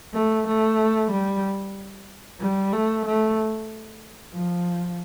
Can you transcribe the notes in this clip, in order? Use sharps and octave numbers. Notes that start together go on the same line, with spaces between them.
A3
A3
G3
G3
A3
A3
F3